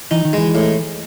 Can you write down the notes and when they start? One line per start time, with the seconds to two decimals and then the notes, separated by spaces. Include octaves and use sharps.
0.11 E3 D#4
0.25 D#3
0.33 E3 G#3
0.55 A2